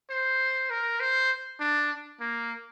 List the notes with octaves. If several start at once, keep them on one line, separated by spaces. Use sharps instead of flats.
C5
A#4
C5
D4
A#3